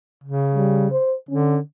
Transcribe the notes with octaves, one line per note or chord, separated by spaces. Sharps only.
C#3
G3
C5
D3 C#4